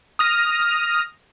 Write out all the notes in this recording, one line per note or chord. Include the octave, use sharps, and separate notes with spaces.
D#6 F6 A#6